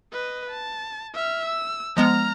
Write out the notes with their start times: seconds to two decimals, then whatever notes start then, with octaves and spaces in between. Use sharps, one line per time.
0.12 B4 D#5
0.50 A5
1.14 E5 F6
1.46 E6
1.97 F3 G#3 B3 A#5 F6